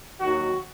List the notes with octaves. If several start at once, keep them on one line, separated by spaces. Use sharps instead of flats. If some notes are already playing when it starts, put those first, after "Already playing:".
D#2 D#3 F#3 F#4